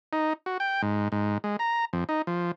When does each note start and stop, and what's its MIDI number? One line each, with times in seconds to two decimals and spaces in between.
0.13 0.33 63
0.46 0.58 66
0.60 0.82 79
0.82 1.08 44
1.12 1.38 44
1.44 1.56 56
1.59 1.85 82
1.93 2.04 41
2.09 2.22 63
2.27 2.51 53